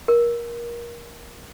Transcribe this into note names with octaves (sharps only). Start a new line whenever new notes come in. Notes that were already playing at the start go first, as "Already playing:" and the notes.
A#4